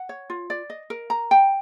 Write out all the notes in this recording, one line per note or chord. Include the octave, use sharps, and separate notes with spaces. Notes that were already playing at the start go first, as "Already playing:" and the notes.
Already playing: F#5
C#5
F4
D5
D#5
A#4
A#5
G5